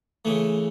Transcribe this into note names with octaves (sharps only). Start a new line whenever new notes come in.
C#3 E3 A3